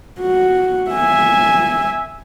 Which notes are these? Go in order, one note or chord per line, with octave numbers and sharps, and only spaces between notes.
F#4
E5 G#5